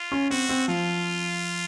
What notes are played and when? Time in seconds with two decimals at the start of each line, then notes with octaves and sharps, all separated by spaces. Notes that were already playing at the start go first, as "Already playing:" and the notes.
Already playing: F4
0.12 C#4
0.30 C4 F#4
0.49 C4
0.68 F3 F4